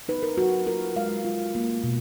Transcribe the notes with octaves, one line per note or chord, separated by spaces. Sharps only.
D#4 B4
A#4
F#3 F#4
F4 A#4
G#3 F5
F4
A#3
B2